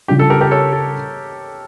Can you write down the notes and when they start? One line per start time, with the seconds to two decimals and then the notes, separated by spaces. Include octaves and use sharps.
0.08 C#3 G3 D4 F4 G4
0.19 A4
0.30 G4 A#4
0.41 G4 A#4
0.51 A4 C#5
0.73 A4